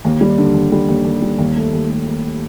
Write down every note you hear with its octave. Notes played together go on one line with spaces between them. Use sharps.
D#2
G3
D3
D#2
G3
D#2
D#2
G3
D#2
A3
D#2
A3
D#2